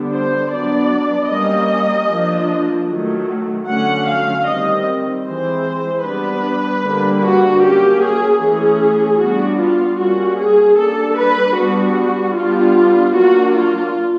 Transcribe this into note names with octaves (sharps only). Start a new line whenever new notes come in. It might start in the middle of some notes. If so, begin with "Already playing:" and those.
Already playing: D3 G3 B3 D4
C5
F#3 B3 D4 D5
G3 A#3 C#4 D#5
F3 A#3 D4
D#3 F#3 A3
D3 F#3 A3 C#4 F#5
F5
D#3 G3 C4 D#5
E3 G#3 C4 C5
G3 B3 D4 B4
D3 G3 A#3 D4
F#4
F#3 A#3 C#4 G4
G#4
E3 A3 C#4 G#4
G3 B3 D4 F#4
F4
G3 A#3 C#4 F#4
G#4
G3 A#3 D4 A4
B4
G3 B3 D4 F#4
G3 B3 D4 F4
F#3 A#3 D4 F#4
F4